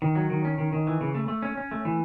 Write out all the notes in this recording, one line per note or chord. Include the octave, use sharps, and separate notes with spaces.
D#3
F#3
D#3
C#4
D#3
D#3
E3
C#3
A3
A3
C#4
C#4
A3
E3